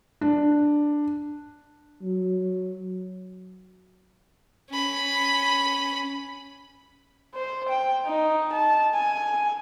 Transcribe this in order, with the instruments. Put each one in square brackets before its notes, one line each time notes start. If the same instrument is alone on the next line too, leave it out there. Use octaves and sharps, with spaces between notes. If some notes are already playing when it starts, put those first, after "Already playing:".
[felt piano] D4
[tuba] F#3
[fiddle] C#4 B5
[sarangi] C5
G5
D#4
A5
G#5